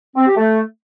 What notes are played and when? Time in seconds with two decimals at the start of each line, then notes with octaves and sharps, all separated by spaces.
0.16 C4
0.26 G4
0.36 A3